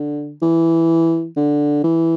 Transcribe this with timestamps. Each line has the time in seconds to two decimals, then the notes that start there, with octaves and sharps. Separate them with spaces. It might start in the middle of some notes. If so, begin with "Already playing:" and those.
Already playing: D3
0.42 E3
1.36 D3
1.84 E3